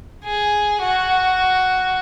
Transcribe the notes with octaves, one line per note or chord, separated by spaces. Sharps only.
G#4
F#4